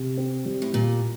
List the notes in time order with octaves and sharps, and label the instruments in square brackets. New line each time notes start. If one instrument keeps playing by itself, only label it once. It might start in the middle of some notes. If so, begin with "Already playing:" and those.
Already playing: [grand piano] C3
C4
G3
[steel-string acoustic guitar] A2
[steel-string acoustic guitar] A#2 [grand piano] G3